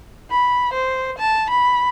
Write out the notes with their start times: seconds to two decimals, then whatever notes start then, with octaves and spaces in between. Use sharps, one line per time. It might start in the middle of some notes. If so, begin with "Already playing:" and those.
0.30 B5
0.73 C5
1.18 A5
1.50 B5